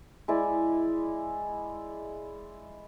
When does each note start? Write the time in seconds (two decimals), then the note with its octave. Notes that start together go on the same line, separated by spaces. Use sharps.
0.28 G#3 E4 D5